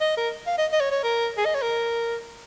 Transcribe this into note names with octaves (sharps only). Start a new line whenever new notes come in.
D#5
A#4
F5
D#5
D#5
C#5
C#5
A#4
G#4
D#5
C#5
A#4